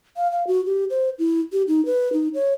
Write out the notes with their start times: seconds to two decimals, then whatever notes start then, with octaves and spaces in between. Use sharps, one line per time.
0.17 F5
0.32 F5
0.47 F#4
0.66 G4
0.90 C5
1.19 E4
1.53 G4
1.68 D#4
1.86 B4
2.13 D#4
2.34 C#5